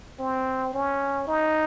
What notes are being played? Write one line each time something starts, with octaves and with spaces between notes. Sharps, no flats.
C4
C#4
D#4